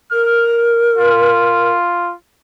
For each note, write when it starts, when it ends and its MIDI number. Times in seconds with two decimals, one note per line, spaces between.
0.12 1.72 70
0.12 0.66 89
0.97 2.14 65